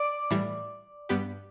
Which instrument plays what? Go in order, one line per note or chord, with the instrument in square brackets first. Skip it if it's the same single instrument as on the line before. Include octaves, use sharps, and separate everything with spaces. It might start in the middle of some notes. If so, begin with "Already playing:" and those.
Already playing: [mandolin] D5
[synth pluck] A2 E3 G3
G2 G3 B3 G4 B4